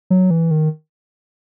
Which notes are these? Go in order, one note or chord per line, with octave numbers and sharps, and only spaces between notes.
F#3
E3
D#3